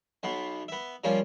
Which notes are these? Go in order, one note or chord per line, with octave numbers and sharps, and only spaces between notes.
B1 B2 B3
B3 E5
F3 G3 A#3 C#4 F4